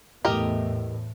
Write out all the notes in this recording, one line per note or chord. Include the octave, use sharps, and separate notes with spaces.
E2 A2 G4 A#4 D#5